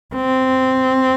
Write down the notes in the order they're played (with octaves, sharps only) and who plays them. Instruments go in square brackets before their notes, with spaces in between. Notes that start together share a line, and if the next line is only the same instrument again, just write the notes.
[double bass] C4